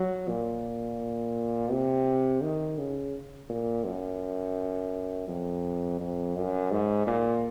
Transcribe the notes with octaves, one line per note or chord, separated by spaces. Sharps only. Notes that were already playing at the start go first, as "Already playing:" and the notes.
Already playing: F#3
A#2
C3
D#3
C#3
A#2
F#2
F2
F2
F#2
G#2
A#2